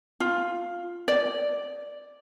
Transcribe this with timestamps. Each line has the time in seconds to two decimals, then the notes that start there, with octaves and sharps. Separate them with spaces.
0.20 F4
1.08 D5